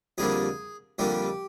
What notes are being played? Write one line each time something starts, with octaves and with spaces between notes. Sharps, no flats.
F2 D3 G3 A#3 G#4
F2 D3 G3 A#3 G4